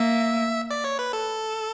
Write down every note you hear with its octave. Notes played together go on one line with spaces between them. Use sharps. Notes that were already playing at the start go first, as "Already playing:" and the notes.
Already playing: A#3 E5
D5
C#5
B4
A4